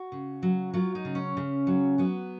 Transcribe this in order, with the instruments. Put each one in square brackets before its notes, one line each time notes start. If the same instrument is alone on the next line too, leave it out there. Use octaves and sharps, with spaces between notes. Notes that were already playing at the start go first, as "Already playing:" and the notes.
Already playing: [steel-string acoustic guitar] F#4
C#3
F#3
F#3 F4
D#4
C#3
C#4
C#3
F#3
F#3 B3